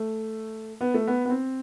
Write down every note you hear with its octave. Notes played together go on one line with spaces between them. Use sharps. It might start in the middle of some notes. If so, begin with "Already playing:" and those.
Already playing: A3
B3
A3
B3
B3
C4